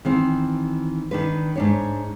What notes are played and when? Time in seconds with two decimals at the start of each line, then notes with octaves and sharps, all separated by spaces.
0.05 D#3 E3 C4
1.11 D#3 D4 B4
1.55 G#2 D4 C#5